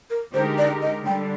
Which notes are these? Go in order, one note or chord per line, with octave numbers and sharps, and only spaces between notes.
A#4
D3 G#3 D#4 G4 A#4 C5
D5
D#5
D3 G3 D4 G5